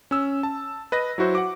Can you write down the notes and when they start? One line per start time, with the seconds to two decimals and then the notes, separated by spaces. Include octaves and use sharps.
0.11 C#4 E6
0.43 A5
0.92 B4 D#5 A#6
1.18 F#3 E4 F#4 C5
1.35 F#5 D6